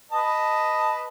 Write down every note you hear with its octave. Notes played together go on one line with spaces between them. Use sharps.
B4 D#5 A5